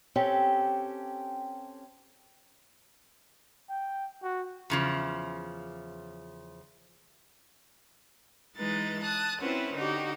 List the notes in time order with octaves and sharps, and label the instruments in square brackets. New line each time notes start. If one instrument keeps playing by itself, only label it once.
[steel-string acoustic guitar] C4 C#4 G4 A4
[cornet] G5
F#4
[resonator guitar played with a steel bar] E2 C#3 F3
[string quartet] E3 G#3 D#4 B4 A6
A5 D#6 F#6
C4 C#4 E4 F#4 B4 C5
D3 D#4 F#4 G4